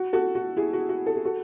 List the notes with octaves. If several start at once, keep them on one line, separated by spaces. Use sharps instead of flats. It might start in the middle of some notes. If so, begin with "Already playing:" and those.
Already playing: F#4
F#4 A4
F#4
E4 G#4
F#4
F#4
A4
G#4
F#4 A4